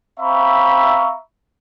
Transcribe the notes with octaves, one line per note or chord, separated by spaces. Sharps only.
C4 E5 F5 A#5 B5 C#6